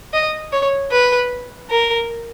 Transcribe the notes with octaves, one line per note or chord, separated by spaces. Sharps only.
D#5
C#5
B4
A#4